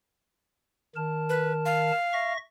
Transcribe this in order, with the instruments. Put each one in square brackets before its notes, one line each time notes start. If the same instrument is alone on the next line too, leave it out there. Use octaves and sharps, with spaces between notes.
[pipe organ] D#3 A#4 A5
[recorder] B4
F5
[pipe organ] E5 C#6 A#6